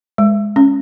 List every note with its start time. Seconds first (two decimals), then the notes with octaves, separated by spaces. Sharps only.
0.18 G#3
0.56 C#4